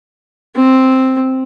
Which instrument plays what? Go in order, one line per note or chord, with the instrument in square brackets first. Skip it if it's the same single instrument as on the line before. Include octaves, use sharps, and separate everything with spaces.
[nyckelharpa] C4